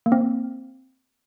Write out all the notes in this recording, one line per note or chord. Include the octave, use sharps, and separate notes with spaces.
A#3
C4